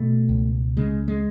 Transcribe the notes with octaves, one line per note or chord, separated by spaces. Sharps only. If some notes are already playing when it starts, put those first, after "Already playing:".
Already playing: B2 A3
C#2
C#3 G#3
G#3